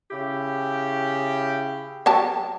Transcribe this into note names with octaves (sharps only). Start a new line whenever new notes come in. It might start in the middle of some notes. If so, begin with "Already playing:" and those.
C#3 E4 G4
F#3 G4 A5